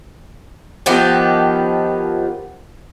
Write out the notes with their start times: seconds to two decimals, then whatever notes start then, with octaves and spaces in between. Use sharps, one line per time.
0.86 D#3 F3 B3 G4